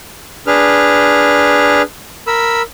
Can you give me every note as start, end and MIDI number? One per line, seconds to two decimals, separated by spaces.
0.47 1.82 62
0.47 1.82 68
0.47 1.82 71
0.47 1.82 89
2.27 2.62 70
2.27 2.62 83
2.27 2.62 88